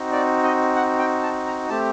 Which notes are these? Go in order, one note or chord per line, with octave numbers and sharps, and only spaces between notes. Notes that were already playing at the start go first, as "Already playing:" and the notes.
Already playing: C4 D#4 F#4
D5
D#5
F#5
G5
A5
A#5
A3 C4 G4 A5